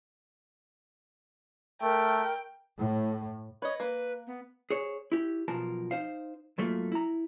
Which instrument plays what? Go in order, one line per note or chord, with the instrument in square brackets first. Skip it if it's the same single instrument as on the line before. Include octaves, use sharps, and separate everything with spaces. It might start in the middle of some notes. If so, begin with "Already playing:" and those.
[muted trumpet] A3 [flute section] A#4 [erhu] G5
[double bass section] A2
[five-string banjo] B4 D#5 [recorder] C#5
[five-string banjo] A#3 [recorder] B4
[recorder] B3
[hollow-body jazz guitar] G#4 C5 C#5
E4 G4
B1 B2 F3 A#4 A5
D#4 C5 F5
G#2 F#3 A3 A#3 F4
E4 A#5